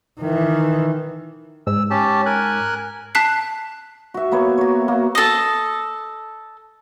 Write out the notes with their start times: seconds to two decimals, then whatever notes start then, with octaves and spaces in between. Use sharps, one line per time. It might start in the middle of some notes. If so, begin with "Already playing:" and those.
0.20 D#3 E3
1.67 G#2 E6
1.90 C#4 G4 A5
2.26 A#4 G#5 F#6
3.15 A5 F#6 B6 C7
4.14 F#4 E5
4.32 A#3 B3 C#5
4.58 F#4 C#5
4.88 A#3
5.15 A4 D#5